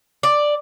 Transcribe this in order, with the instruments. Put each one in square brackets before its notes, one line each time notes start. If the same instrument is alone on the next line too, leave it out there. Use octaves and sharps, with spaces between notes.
[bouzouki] D5